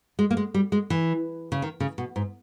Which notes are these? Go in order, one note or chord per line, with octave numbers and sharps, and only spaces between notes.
G#3
A#3
G#3
G3
G#3
E3
C#3
D#3
C#3
B2
G#2